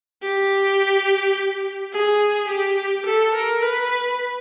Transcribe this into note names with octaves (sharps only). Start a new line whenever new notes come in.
G4
G#4
G4
A4
A#4
B4